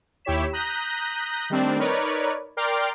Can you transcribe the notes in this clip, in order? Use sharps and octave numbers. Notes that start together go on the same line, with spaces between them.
D#2 E4 G4 C#5 B6 E7
A#5 D#6 F#6 G6 A#6 B6
D#3 G3 A3 C4 D4
D#4 A#4 B4 C#5 D5
A#4 D5 G5 C6 D6 F6